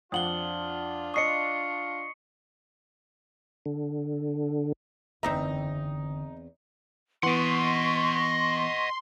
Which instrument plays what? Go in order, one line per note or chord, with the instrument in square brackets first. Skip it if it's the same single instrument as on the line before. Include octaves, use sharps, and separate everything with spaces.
[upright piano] F2 F#5 [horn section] D4 F4 [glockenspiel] D#6 F#7 G7
[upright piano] D#5 D#6 [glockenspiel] C#6 C7 C#7
[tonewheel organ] D3
[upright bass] F#1 D3 [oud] E2 C4 E5 [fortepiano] D#4 A#5
[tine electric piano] E3 B3 [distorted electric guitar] D#5 F#5 [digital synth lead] C6 [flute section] C#6